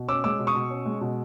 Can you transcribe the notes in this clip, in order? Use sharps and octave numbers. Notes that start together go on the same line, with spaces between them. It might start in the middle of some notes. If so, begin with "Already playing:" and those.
Already playing: B2
C#4 D6 E6
G#3 D6 E6
B2
C#6 D#6
B2
C#4
G#3
B2